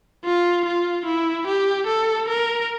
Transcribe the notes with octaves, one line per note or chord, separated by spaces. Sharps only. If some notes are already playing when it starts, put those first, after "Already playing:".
F4
F4
E4
G4
A4
A#4